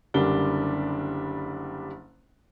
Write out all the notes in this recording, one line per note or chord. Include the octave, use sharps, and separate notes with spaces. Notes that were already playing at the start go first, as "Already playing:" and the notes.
F#1 D3 G3 D4 G7